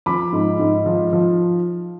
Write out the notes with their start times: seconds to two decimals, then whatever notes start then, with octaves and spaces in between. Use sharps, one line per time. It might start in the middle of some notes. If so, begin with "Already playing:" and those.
0.06 F3 B5 D6
0.33 G#2
0.59 G#2
0.86 F3
1.13 F3